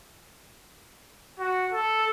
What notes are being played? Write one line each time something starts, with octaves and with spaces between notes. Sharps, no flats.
F#4
A4